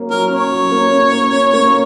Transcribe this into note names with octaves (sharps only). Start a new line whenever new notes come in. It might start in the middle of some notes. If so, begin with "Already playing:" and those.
Already playing: F#3 A#3 C#4
F#3 A#4
C#4 C#5
F#3
A#3
C#4
A#3
C#4
A#3